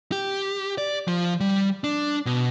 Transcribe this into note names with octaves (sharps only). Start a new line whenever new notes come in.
G4
D5
F3
G3
D4
B2